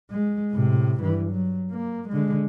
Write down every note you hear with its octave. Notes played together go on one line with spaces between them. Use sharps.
G#3
A2 C3
G2 E3
F#3
A#3
D3 G#3